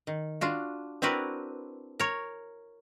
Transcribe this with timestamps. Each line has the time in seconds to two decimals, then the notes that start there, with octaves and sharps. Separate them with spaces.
0.07 D#3
0.41 D4 F4 F#4
1.02 C4 D4 E4 F#4 A#4 B4
2.00 A#4 C#5